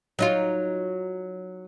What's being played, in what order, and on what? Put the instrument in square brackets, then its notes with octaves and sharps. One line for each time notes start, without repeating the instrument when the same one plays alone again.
[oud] F#3 D#4 F4